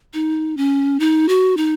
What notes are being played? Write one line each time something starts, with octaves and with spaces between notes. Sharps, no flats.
D#4
C#4
D#4
F#4
D#4